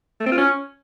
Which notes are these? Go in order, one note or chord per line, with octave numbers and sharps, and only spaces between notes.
A3
C4
F4
C#4